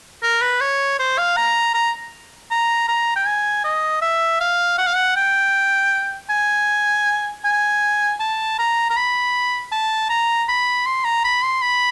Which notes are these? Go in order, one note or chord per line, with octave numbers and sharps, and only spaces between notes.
A#4
B4
C#5
C5
F5
A#5
A#5
A#5
A#5
G5
G#5
D#5
E5
F5
F#5
F5
F#5
G5
G#5
G#5
A5
A#5
A#5
B5
A5
A#5
B5
C6
A#5
B5
C6
B5